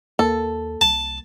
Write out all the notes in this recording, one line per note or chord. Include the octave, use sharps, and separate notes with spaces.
D#2 A#3 A4
C2 A5